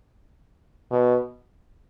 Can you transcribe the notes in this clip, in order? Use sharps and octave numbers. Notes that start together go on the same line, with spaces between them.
B2